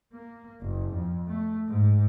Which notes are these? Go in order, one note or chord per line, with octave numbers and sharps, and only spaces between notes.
A#3
F#1
F2
A3
G#2